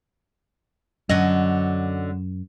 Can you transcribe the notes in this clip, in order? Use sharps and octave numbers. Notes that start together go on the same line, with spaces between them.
F#2 D3 F#3 D#5